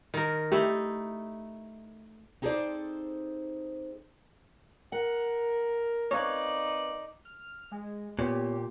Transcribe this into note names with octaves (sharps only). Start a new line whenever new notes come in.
D#3 A#4
A3 D#4 E4 G4
C4 D#4 G#4 A4 C5 D5
A#4 F#5
C4 D#4 B4 C#5 D5 F5
F6
G#3
A#2 B3 G4 C#5 G5